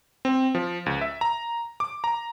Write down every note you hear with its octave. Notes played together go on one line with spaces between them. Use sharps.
C4
F3
C#2
E5
A#5
D6
A#5